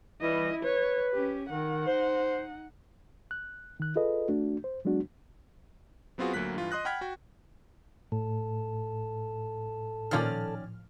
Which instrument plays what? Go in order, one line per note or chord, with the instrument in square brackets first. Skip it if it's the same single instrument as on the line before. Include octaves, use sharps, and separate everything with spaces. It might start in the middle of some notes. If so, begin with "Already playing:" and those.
[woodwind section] E3 G3 [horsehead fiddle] E4 D#5
[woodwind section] B4 [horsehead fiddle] C#5
[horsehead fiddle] C#4 G4
[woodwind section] D#3 [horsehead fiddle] D#4 F#5
[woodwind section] C5
[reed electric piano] F#6
D#3 F#6
F4 G#4 A4 B4 D#5
A3 D4 F#4
C5
F#3 G#3 B3 D4 F#4
[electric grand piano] F#3 B3 C4 F4 F#4 G#4
D2 F#3 A#3 F#6 B6
G2 E3 F4
D#5 C6 D#6 F#6 A#6
F#5 G5 B5 F6 G#6 B6
F#4 G5
[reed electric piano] A2 [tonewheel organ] A4
[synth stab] A#2 F3 F6 [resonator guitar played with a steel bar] D#3 C#4 D5